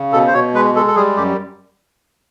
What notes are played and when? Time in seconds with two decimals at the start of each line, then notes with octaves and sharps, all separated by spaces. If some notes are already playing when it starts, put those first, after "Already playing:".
Already playing: C#3
0.13 B2 A4
0.27 C5
0.34 B2 C#5
0.54 G#3 B4
0.75 G#3 A4
0.88 A4
0.96 G3 G#4
1.17 F#2 G4